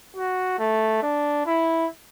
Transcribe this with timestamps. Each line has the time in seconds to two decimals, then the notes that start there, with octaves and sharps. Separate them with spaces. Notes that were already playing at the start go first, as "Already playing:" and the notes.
0.16 F#4
0.59 A3
1.02 D4
1.46 E4